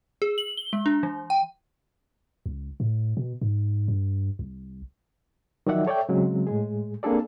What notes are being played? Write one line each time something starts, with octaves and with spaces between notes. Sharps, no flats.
G#4
F#7
G7
G#3
D4
E3
G5
C#2
A2
B2
G#2
G2
C2
D#3 F3 F#3 D5 E5 F#5
A4 C#5 D5 E5 G5
C#3 F#3 G#3 C4
A2 G#3 G#4
A#3 C4 D4 G#4 A4 D5